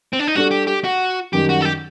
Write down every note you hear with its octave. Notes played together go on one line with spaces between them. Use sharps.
C4
D4
D#4
G3 D4 F#4 A4
G4
G4
F#4
F#2 D#3 G3 G4
F#4
A4
G4